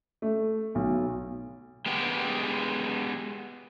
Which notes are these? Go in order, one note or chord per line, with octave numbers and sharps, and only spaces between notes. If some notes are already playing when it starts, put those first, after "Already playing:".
A3
B1
G#3 B3 G4